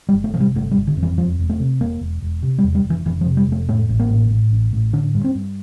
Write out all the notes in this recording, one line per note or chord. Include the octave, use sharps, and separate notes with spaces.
G3
G1
A3
C3 F3
G3
G1 A3
G3
G1
D3
F2
E3
E1 F3
E1
A3
C3
E1 A#3
E1
E1
C3
G3
E2
G3
F1
E3
F1 E3
F3
C3
G3
F1
A3
A2 A3
A1
A#3
A2
A2
A1
A2
D3 D4
G2
C4
G2